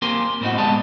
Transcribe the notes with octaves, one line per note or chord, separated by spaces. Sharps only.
A#3 C4 G4 A#4 G#5 C6
A2 G3 C4 C#4 D#4 F#4
G#3 B3 G4 D5 D#5 A5